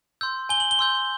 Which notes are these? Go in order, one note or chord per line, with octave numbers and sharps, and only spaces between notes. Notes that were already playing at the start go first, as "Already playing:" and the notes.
C6 E6 G6
G#5 G7
F#7
G7
C6 E6 G6